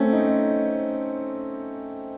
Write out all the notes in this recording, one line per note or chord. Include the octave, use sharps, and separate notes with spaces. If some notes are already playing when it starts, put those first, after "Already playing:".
Already playing: A3 C4 C#4
D#4